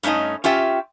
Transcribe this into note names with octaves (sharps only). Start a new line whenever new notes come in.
G2 A3 C#4 D#4 D#5
C#4 F4 G4 E5 G5